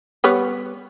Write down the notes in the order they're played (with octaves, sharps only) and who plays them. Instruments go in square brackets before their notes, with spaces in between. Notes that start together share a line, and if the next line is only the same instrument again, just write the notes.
[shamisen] G3 B3 C#5